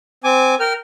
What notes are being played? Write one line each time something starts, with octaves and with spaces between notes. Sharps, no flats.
C4 G#5 D6
A#4 G5 F6